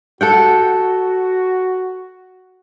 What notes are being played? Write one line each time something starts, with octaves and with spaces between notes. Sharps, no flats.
F#4 A4 F#5 G5